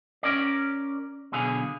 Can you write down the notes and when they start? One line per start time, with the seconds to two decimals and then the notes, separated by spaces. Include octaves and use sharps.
0.23 C#4 A#4 D5
1.32 B1 B2 D3 G#4 F5